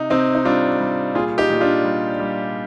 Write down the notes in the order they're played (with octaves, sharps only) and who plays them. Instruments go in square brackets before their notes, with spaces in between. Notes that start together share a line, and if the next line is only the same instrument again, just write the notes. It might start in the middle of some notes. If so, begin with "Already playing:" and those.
Already playing: [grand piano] C3 D#4
C3 C4 D#4
D#4
G3 D4 F4
G3
A#2 F4 G#4
D#4 G4
A#2
D4 F4
G3
G3